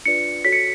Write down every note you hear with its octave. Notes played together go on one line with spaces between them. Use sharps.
D4 F4 B4 D5 C#7
F#4 A4 C#5 B6
C#7